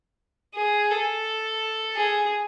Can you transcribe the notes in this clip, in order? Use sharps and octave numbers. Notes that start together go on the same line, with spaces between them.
G#4
A4
G#4